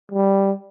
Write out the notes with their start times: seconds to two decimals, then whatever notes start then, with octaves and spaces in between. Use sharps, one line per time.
0.12 G3